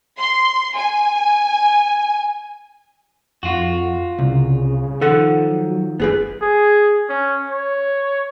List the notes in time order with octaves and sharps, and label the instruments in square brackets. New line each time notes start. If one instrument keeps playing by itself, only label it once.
[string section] C6
G#5
[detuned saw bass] F2 [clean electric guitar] F4 F#4
[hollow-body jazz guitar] C2 [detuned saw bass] C#3
[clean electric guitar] D#3 F3 [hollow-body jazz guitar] A4 F#5
[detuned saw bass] F#3
[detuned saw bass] F#1 [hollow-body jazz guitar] B3 G#4 B4
[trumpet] G#4
C#4
C#5